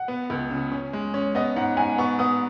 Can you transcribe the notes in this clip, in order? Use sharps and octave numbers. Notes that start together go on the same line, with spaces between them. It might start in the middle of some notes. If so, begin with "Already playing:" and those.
Already playing: F#5
B3
C#2
C#3
C#4
G#3
C#4
B3 D#5
G#2 F#5
G#2 G#5
B3 C#6
B3 D#6